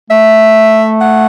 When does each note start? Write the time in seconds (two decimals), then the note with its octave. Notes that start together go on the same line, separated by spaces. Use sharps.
0.10 A3 E5
1.01 F#5